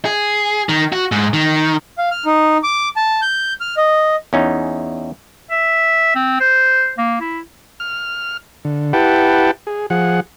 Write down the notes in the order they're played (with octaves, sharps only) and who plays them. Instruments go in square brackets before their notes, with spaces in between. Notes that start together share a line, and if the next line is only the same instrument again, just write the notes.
[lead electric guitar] G#4
D#3
F#4
G#2
D#3
[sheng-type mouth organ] F5
F6
D#4
D6
A5
G6
F6
D#5
[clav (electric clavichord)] E2 C#4 D#4
[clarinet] E5
C4
C5
A#3
E4
[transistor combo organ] F6
D3
E4 G4 B4 F#5 G5 A5
G#4
F3 G#4 F#5